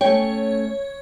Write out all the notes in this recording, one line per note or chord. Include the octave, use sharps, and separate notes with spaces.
A3 C#4 C#5 G5